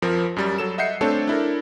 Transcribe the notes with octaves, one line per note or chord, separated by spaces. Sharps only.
F2 F3 A#4
F#2 G3 A6
F#3 A4 E7
D#5 E5 F#5 G6 C7 C#7
A3 C4 D4 A4 C#5 A5
D4 E4 A4 A#4